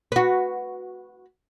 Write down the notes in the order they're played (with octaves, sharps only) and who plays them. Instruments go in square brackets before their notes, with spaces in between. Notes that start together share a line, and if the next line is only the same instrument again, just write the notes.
[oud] F#4 B4